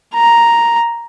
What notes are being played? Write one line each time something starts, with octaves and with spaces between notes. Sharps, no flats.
A#5